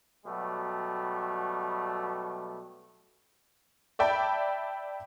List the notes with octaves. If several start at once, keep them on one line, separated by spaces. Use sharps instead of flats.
B2 F#3 G3 A3
D5 E5 G5 A5 B5